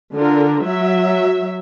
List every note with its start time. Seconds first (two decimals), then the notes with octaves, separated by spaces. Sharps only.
0.13 D3 F4 A#4
0.64 F#3 E5